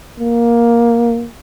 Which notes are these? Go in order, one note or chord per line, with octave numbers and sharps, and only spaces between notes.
A#3